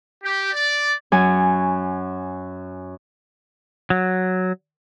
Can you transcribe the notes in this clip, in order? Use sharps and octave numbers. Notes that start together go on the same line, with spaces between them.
G4
D5
F#2 F#3 G#5
F#3